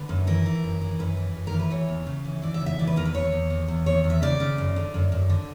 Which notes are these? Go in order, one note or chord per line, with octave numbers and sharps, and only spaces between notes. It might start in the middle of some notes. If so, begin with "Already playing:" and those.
Already playing: D3 B4
F#2
E3 A#4
E3
F#2
E3
F#2 B4
E3
F#2
A#4
E3
B4
E3 C#5
E2
C#3
E3
E3 D5
E5
C#3
E5
E3 D5
B4
E2 A#4
B4
E2 C#5
E2
E2
E2
E2 C#5
E2
E5
C#3 D5
C#3
F#2
D3
F#2
F#2
D3